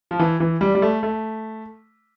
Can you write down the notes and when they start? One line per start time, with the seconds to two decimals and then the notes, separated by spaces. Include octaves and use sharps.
0.11 F3
0.19 E3
0.40 E3
0.61 G3
0.75 G3
0.82 A3
1.03 A3